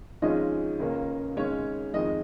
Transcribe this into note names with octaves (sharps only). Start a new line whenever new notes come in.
G#1 G#2 F3 G#3 C#4 D#5
C#2 C#3 A#3 C#4
G#1 G#2 G#3 C#4 C#5
F2 D#3 G#3 D#5